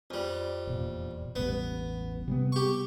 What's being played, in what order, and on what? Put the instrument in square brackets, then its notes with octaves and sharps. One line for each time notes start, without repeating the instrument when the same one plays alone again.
[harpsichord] F2 G3
[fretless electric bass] E1 A#2
[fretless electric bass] E1 A1 G3 [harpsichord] B3
[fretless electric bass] C3 G3 B3
[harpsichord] G4 C#6